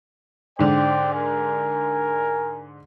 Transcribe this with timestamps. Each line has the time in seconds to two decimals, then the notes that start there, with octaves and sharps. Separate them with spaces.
0.59 G#2 D3 C5 D5 G5
1.13 A#4 G#5